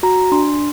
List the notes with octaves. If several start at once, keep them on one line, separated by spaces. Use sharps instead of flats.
F#4 A#5
D4 C6